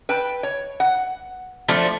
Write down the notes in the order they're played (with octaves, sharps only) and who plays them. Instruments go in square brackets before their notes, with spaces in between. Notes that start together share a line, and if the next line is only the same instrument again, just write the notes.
[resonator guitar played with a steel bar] B4 G5 A5
C#5
F#5
[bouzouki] F3 A3 D4